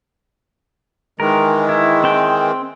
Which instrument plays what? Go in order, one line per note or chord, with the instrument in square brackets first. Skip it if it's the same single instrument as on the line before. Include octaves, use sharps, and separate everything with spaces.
[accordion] D#3 E3 G#3 [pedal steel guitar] A#4
[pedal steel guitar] E4
C4 G5